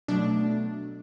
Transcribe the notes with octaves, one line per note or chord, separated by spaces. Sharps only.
B2 F#3 A3 D4